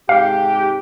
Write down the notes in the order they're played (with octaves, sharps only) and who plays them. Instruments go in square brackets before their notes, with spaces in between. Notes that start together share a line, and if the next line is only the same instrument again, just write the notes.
[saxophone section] G#2 C3 G4 [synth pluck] F5